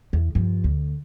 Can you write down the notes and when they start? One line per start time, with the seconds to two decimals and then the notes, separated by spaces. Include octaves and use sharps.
0.13 E2
0.35 G2 F3
0.64 D2